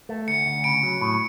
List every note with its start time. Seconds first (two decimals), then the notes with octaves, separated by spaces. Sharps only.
0.09 A3
0.27 D2 C#7
0.46 D2
0.64 C#3 D7
0.83 F#3
1.01 A2